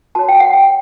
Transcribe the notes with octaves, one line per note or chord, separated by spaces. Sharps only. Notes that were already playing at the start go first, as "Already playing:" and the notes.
F#4 C#5 A5
G5
F#5
G5